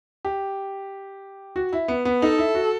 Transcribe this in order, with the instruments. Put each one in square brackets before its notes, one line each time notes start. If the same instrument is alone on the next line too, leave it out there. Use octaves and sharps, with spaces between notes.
[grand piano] G4
F#4
E4
B3
B3
[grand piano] D#4 [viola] A4
[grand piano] E4
F#4